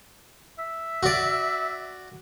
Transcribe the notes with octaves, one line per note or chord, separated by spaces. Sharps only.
E5
F#4 D5